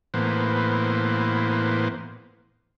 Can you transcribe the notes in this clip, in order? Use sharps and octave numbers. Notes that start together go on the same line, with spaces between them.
A2 E3 A#3 B3 C5